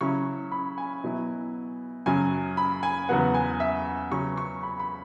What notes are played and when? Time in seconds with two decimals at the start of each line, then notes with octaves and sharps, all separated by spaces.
0.01 C#3 F#3 C#4 E4 C#6
0.52 B5
0.78 G#5
1.04 B2 F#3 E4
2.06 F#2 C#3 F#3 C#4 G#5
2.57 B5
2.83 G#5
3.09 E2 C#3 F#3 B3 F#5
3.34 G#5
3.60 E5
4.11 C#3 F#3 C#4 C#6
4.37 C#6
4.63 B5
4.80 B5